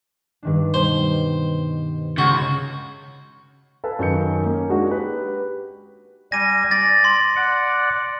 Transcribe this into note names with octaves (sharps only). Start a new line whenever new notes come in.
G2 D#3 D4
B2 G3 C5
C#2 F#4
A4 B4 F5 G#5 A5
F#2 D#3 D#4 G6 C#7
A#3 C#4
G#3 D4 D#4 F#4 G#4
G4 B4
G3 G#5 A#6 D#7
D5 A6 A#6
C6
D5 F#5